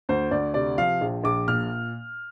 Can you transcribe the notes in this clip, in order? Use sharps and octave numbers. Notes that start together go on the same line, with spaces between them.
D2 C5
D2 D5
C3 D5
F3 F5
A#1
A#1 D6
A#2 F6